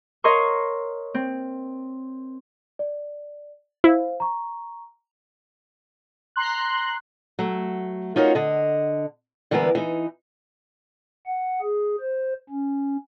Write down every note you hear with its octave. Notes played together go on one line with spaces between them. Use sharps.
A#4 C#5 D#5 F5 C6 C#6
C4
D5
E4 C5 F5
A#5 C#6
A#5 C6 F#6
F#3 A3
C#4 D#4 F4 F#4 A#4 C#5
D3 D#5
D3 E3 G3 G#3 B3 A#4
E3 D#4
F#5
G#4
C5
C#4